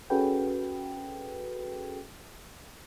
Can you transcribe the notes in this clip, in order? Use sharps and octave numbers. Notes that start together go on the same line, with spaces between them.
C#4 F#4 G#4 A4 B4 G5